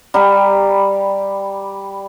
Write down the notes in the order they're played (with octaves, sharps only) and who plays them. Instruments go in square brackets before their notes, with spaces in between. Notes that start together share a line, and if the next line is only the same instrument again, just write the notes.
[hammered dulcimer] G3 G4 A#5